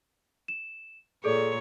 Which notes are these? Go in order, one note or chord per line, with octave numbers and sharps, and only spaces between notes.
E7
A#2 G#4 A4 C#5 D5